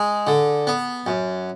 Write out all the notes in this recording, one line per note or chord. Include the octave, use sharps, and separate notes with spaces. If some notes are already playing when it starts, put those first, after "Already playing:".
Already playing: G#3 G#4
D3
B3
F#2